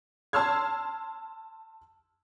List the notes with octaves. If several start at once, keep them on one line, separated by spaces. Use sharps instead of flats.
A5 C6 E6 F6 G#6